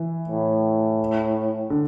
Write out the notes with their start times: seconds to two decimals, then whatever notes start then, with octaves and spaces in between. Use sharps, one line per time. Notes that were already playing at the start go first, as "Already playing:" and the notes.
Already playing: E3
0.28 A2
1.70 D3